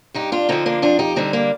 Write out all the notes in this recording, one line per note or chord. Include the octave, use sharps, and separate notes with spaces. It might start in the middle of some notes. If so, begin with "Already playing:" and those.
G2 D#4 G4
D4 F4
D3 F3 C4 D#4
A#3 D4
F2 D4 F4
D#4 G4
D3 G3 C4 D#4
A#3 D4